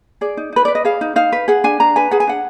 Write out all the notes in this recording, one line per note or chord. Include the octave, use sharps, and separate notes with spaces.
G#4 D5
D#4
D#4 B4
B4 D5
D#5
G#4 F5
D#4
D#4 F5
B4
G#4 F#5
D4 G#5
D4 A#5
B4 G#5
G#4 F#5
G#5
D4 F#5